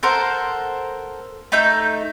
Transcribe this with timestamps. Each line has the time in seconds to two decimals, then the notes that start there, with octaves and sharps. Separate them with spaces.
0.03 A4 A#4 C5 F#5
1.52 A3 D#4 E6 G6